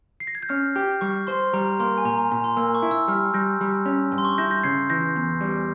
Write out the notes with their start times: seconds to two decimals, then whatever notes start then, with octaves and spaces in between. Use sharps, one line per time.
0.20 C7
0.27 A#6
0.35 G#6
0.43 G6
0.49 C#4 F6
0.76 G4 G6
1.01 G3 C#6
1.27 C5 C6
1.53 G3 A#5
1.80 A#3 C6
1.98 G#5
2.05 A#2 A#5
2.18 A#5
2.30 A#2 A#5
2.44 C6
2.57 A#3 E6
2.75 C#6
2.83 E4
2.91 E6
3.08 G3 F6
3.34 G3 G6 A#6
3.61 G3
3.86 C#4
4.12 G2
4.18 C6
4.25 C#6
4.38 E4 G6 A#6
4.51 G6 A#6
4.63 C#3 G#6 C7
4.90 E3 G6 A#6
5.16 E2
5.41 G3